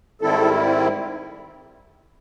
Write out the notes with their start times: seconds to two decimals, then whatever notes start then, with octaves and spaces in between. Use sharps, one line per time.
0.21 G#2 D#3 G3 C4 E4 A4